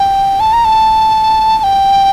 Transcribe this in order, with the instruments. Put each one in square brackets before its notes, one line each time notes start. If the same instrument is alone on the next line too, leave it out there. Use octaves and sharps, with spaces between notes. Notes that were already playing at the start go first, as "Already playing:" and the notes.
Already playing: [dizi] G5
A5
A#5
A5
A5
G5